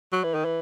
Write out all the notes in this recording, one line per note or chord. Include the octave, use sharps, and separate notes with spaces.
F#3
E3
D#3
E3